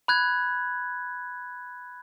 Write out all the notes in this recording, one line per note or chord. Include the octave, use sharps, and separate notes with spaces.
B5 F#6 G#6